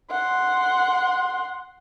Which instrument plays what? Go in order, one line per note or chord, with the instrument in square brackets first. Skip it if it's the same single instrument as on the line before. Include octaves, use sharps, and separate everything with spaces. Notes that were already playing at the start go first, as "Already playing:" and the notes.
[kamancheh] F#5 C6